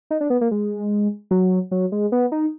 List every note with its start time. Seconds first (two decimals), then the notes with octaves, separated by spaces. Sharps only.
0.11 D#4
0.21 D4
0.30 B3
0.41 A#3
0.51 G#3
1.31 F#3
1.71 F#3
1.92 G#3
2.12 B3
2.32 D#4